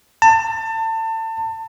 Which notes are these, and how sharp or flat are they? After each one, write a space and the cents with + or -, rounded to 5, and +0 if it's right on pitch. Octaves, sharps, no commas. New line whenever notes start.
A5 +30